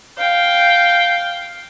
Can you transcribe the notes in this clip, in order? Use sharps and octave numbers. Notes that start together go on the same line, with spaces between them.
F5 G5